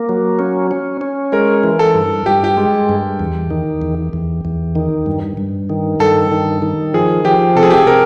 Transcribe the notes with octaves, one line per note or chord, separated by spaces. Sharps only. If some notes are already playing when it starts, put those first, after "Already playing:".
Already playing: A#3
F#3
C#4
C#4
C#4
G#3 A#4
E3
A4
G2
G2 G4
G4
G#3
G2
E2
D#3
E2
E2
E2
D#3
G2
G2
D#3
G2 A4
D#3
D#3
F3 G#4
F3 G4
C3 A4
G#4
G4
G#4
C3 A#4